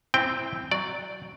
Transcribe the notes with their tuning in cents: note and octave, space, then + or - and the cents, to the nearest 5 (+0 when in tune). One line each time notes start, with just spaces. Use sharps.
C4 +0 E4 +0 G5 +0
F#3 +5 D5 +0